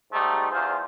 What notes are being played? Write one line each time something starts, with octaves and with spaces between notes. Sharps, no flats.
G#2 G3 A3 D#4
E2 F4 G#4 C5